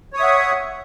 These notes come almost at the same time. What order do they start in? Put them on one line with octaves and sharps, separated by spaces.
C#5 D#6 E5 F#5